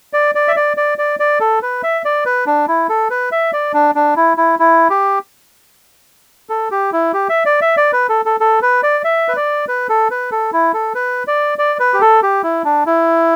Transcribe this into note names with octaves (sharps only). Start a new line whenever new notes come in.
D5
D5
E5
D5
D5
D5
D5
A4
B4
E5
D5
B4
D4
E4
A4
B4
E5
D5
D4
D4
E4
E4
E4
G4
A4
G4
E4
G4
E5
D5
E5
D5
B4
A4
A4
A4
B4
D5
E5
B4
D5
B4
A4
B4
A4
E4
A4
B4
D5
D5
B4
G4
A4
G4
E4
D4
E4